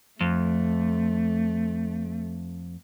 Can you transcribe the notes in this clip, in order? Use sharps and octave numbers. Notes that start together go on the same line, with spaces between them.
F2 A3